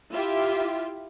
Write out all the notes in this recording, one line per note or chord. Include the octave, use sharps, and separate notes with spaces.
E4 F4 G4 E5